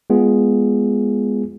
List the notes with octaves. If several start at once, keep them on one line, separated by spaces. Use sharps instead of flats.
G#3 B3 F4 G#4